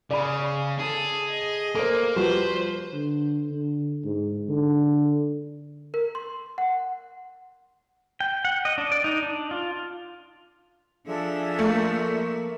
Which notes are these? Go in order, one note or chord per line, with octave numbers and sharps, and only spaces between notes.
C#3 D5 B5
G#4 A4
D#5
A#3 A4 A#4 C5
F3 G3 F#4 B4 C5
D3
D3
G#2
D3
A#4
C6
F#5
G5
F#5
D#5
D4
D5
D#4
D4
F4
F3 D4 G#4 A4 E5
A3 A#3